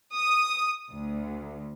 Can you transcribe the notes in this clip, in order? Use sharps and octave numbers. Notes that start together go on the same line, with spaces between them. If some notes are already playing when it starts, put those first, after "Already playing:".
D#6
D2